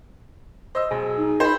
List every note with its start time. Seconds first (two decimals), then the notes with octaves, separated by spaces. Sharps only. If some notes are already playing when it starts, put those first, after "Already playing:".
0.75 C5 D#5 E6
0.91 B1 G#4
1.17 D#4
1.40 C5 B5